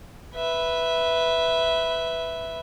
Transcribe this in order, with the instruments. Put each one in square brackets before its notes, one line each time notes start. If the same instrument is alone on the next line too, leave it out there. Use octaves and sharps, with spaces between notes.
[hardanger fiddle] B4 E5